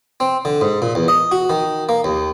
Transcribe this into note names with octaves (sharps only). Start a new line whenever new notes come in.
C4
D3
G#2
A#2
E2
D#5
F#4
D#3
A#3
D#2